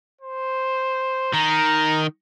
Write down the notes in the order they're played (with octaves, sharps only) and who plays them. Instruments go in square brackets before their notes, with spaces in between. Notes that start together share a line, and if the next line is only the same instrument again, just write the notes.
[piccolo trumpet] C5
[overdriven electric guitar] D#3 [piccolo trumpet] A#5